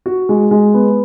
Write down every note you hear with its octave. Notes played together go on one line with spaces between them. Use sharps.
F#4
G#3
G#3
B3